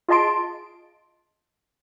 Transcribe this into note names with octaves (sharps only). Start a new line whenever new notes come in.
F4 G#4 D#5 A5 C6 D7